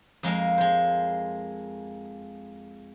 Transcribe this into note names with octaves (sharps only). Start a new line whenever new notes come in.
F2 G#3 A#3 F5
G#3 C5